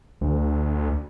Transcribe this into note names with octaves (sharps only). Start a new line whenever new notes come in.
D2